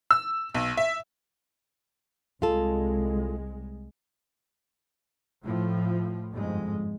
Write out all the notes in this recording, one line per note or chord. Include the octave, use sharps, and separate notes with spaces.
E6
B1
E5
C2 G#3 F4 A4
A2 F3
G1 F2 G#2 G#3